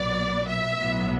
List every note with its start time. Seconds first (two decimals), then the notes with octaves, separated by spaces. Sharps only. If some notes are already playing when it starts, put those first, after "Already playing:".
Already playing: B1 A#2 F#3 B3 D5
0.48 E5
0.79 B1 A2 F#3 B3